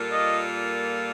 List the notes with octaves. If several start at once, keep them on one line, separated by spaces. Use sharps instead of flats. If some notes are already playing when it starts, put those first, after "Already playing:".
Already playing: A#2 G3 A#3 F4 A4
D#5